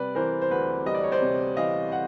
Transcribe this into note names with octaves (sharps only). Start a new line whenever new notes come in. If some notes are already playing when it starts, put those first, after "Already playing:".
Already playing: C3 G3 B4 D5
E3 A#4 C5
C5
D2 B4
G3 D#5
D5
C#5
C5 D5
C3
E3 D#5 F5
F#5